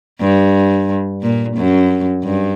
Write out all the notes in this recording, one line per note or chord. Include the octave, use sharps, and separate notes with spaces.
G2
A#2
F#2
G2